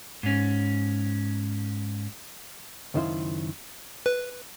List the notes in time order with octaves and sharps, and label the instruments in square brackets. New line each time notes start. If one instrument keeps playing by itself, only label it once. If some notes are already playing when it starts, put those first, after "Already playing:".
[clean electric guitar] G#2 C#4
[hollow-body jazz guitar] C#2 F#2 D#3 E4 F4 C5
[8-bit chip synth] B4